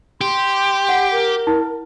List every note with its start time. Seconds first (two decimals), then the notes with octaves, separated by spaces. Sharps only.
0.21 G4 C6
0.89 F#5
1.12 A#4
1.47 E4